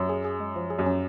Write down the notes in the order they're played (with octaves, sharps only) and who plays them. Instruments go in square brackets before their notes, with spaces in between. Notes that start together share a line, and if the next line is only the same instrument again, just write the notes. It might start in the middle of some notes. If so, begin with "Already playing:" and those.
Already playing: [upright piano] F#2
[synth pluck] G#4
G#4
G#3
F3
G#4
[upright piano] F#2
[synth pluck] C#4